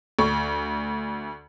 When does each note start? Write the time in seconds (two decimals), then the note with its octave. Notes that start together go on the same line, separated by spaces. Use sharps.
0.19 D2